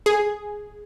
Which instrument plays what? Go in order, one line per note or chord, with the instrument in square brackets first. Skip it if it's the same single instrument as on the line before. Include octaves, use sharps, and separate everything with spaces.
[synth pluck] G#4